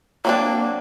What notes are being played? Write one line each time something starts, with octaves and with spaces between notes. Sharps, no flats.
F#3 A#3 C4 D4